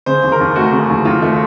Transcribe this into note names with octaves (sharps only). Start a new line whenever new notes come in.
C#3 C5
D#2
A#4
D#2
A3 F#4
C#3
D#2
D#2 F4
A3